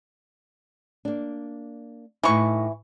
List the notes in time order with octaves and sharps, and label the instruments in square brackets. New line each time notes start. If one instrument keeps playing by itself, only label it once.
[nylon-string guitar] A#3 D4
[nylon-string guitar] A2 D#4 [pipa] E3 C#6